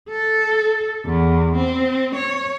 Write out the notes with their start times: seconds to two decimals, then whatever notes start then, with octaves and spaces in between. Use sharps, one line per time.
0.10 A4
1.05 E2
1.57 C4
2.15 C#5